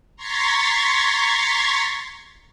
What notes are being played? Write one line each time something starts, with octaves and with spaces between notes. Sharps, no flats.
A#5 C6 C#6 G#6 A6 B6